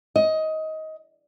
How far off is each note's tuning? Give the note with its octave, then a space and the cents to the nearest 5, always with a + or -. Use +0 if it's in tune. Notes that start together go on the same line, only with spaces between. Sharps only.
D#5 +20